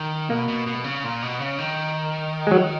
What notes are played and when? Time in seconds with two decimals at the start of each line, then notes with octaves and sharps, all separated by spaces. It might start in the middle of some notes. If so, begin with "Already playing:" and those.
Already playing: D#3
0.29 B2 A#3
0.48 B2
0.67 B2
0.84 C#3
1.04 A#2
1.22 B2
1.40 C#3
1.59 D#3
2.47 G#3
2.51 F#3